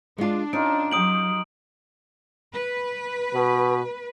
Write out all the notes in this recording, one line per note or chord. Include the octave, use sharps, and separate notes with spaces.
G#3 D4 F4
C#4 D#4 F4 A#4 D7
F#3 G4 G5 D#6 D7 F#7
B4
B2